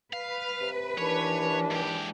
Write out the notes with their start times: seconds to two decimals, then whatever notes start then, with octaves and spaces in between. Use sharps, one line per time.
0.13 B4 F5
0.61 C3
0.98 D#2 E3 D4 C#5
1.70 G#2 G4